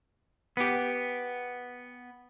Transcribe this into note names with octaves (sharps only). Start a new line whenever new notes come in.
B3 G4